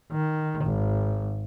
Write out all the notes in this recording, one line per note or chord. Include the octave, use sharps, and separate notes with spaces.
D#3
G#1